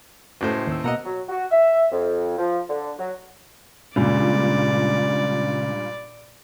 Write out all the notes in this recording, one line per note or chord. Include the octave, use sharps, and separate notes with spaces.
C#2 A2 A3 F#4 C5
D#2 E6
B2 A#3 D#5 F#5 A#5 E6
F#3
F#4
E5
F2
F3
D3
F#3
C#2 G2 A#2 D5